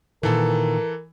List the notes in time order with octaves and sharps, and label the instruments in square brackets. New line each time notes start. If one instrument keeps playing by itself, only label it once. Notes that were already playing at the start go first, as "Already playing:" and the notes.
[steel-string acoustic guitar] A#2 D#3 [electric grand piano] E3 A4 [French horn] A#4